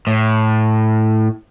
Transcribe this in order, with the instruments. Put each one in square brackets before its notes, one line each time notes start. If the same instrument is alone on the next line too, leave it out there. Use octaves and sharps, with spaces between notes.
[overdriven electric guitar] A2